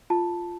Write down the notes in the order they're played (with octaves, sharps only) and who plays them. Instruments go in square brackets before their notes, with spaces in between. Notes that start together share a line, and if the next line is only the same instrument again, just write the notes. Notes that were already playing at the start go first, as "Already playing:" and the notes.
[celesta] F4 A5